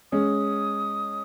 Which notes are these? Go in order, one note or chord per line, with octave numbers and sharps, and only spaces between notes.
G#3 C#4 D#6